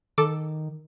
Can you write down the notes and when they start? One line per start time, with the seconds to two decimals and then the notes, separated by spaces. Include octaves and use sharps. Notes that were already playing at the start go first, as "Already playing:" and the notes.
0.18 D#3 A4 D6